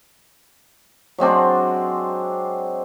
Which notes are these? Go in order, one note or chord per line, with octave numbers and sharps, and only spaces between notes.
F#3 G#3 C4 D4